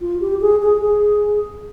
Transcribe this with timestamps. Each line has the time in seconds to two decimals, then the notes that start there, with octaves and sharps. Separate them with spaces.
0.01 F4
0.20 G4
0.41 G#4
0.62 G#4
0.82 G#4